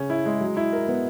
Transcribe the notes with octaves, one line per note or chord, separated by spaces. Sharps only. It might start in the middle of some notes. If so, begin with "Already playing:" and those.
Already playing: C#3 C#4
E4
G#3
F#3
E4
A#4
B3